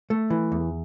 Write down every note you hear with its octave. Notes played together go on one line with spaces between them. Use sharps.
A3
E3
E2